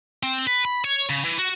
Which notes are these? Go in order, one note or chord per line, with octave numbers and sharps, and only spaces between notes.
C4
B4
B5
C#5
C#3
E3
F#4